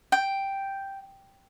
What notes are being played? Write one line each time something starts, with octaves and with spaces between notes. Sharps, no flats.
G5